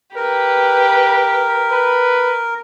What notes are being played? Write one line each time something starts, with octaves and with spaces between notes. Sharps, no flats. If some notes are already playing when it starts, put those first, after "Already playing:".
G4 A#4 B4
B4